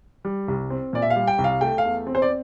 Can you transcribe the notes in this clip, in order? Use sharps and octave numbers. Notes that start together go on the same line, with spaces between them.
G3
C2
C4
A#2 D5
E5
F5
G3
G5
C2
F5
A3 G5
F5
E2
C4
C5
D5